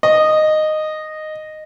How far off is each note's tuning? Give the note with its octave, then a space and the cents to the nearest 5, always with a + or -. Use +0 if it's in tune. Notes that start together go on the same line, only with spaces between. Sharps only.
D#5 -10